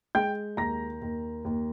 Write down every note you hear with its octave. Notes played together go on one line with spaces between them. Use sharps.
G#3 G5 G6
D#2 A#5 A#6
D#2
D#2